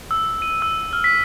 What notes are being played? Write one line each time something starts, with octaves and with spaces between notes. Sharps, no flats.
E6
D#7
E6
F6
B6